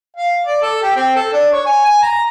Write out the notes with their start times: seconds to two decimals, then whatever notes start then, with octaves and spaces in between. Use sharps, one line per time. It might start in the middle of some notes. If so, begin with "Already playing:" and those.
0.17 F5
0.46 D5
0.62 A4
0.83 G4
0.96 C4
1.16 A4
1.33 D4
1.53 C#5
1.66 G#5
1.85 G#5
2.02 A#5